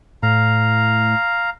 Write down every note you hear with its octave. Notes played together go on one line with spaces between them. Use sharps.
A2 F5 A#5